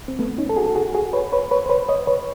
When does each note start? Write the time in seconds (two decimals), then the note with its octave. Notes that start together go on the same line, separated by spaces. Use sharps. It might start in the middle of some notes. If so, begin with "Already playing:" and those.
0.08 C4
0.19 A3 B3
0.38 C#4 D#4
0.49 A4
0.56 F#4 G#4
0.66 A4
0.75 F#4 G#4
0.95 F#4 G#4
1.13 B4 C#5
1.32 B4 C#5
1.51 B4 C#5
1.66 C5
1.70 B4 C#5
1.89 C#5 D#5
2.07 B4 C#5